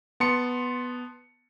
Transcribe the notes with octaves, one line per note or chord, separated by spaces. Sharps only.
B3 A5 C6 C#7